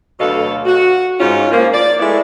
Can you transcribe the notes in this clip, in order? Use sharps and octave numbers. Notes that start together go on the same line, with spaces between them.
D2 B2 F#3 A4 D#5 F5
F#4
G#2 C#4 F4
F3 A#3
D5
G#3 A3 B3 E4